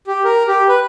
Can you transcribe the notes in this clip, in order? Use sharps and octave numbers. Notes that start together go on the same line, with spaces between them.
G4
A#4
G4
B4